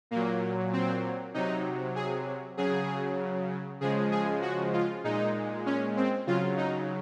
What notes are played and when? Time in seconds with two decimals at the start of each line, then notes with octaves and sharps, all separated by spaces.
0.11 A#2 F#3 A#3
0.73 C4
1.34 C3 F#3 D#4
1.96 G#4
2.57 C#3 F#3 G#4
3.81 C#3 F3 G#3 G#4
4.11 G#4
4.42 F#4
4.73 F4
5.04 A#2 G#3 D#4
5.66 C#4
5.97 C4
6.27 C#3 F#3 F4
6.57 D#4